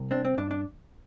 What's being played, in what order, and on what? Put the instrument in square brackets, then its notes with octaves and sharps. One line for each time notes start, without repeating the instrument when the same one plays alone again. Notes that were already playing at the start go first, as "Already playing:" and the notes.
Already playing: [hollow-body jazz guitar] C2
C4 D4
C4
G2 D4
D4